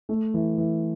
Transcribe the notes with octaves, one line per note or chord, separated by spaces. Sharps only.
A3
E3
E3